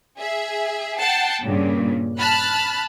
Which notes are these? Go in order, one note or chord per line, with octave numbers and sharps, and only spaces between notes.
G#4 E5
F#5 G5 A5 C7
G2 A#2 C#3
A5 B5 F6 F#6